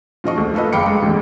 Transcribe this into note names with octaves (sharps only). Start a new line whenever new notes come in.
A#2 F3 D#5 C#6
D2
A3 A#3 A4 B4 D#5
F#1 F5 G5 B5 D6 C#7
G#3
A1 E2